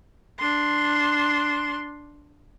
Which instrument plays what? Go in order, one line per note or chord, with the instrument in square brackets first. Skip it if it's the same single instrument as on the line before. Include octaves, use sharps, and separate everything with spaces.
[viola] D4 C6